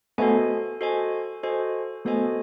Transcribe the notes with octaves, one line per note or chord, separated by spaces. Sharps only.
A3 B3 F#4 A4 C5 D#5 G#5
F#4 A4 C5 D#5 G#5
F#4 A4 C5 D#5 G#5
A3 B3 F#4 A4 C5 D#5 G#5